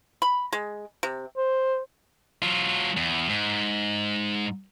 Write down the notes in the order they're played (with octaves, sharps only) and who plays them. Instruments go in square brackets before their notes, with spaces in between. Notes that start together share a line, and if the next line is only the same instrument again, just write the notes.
[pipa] B5
G#3
C3
[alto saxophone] C5
[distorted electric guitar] F#3 F4
E2
G#2